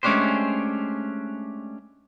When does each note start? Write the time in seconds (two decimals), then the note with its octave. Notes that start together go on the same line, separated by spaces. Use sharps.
0.03 G#3 A3 C#4 D4 G4 C5